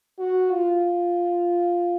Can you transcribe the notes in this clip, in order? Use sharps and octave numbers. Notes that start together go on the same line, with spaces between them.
F#4
F4